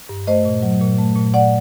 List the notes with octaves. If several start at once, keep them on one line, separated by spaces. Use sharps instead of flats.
G2
A3 C5 D#5
A#2
F#3
A#2
A3
A#2
A#2 D5 F#5